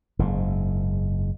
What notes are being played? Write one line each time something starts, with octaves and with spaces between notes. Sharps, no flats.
F#1 G#2